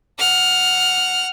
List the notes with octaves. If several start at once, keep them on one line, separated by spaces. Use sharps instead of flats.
F#5 F6